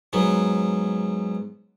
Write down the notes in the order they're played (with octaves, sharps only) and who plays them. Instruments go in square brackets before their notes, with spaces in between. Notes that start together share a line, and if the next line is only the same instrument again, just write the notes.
[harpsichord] G#2 F#3 B3